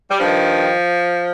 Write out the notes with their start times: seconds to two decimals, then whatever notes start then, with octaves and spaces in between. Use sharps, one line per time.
0.10 G3
0.20 G2 D#3 F3